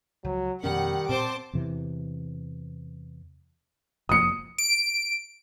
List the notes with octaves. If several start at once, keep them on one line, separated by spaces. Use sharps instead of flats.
C#2 F3 F#3
F2 B2 D#3 G3 C#4 F#5
A#2 C4 C5 A5 D6
E2 C3 E3
F1 F3 A#3 D#6 C#7
D7